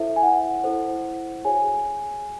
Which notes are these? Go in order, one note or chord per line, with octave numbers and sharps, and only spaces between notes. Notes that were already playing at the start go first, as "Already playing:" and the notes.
Already playing: E4 A4 C5 E5
G#5
F#5
E4 A4 C5
F#4 G#4 C#5 G#5